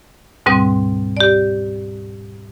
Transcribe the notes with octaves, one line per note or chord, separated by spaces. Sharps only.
D2 G#2 B2 G3 C4 D#6
G4 D5